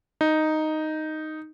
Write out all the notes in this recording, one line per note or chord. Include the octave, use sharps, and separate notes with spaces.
D#4